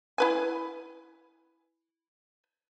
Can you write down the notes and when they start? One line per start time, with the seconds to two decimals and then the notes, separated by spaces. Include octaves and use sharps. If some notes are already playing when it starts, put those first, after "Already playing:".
0.18 E4 B4 G#5